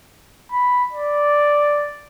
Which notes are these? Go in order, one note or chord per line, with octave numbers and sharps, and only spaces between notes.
B5
D5